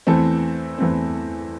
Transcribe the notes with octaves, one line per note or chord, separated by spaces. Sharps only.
E2 E3 A3 C4 A4
E2 E3 A3 C4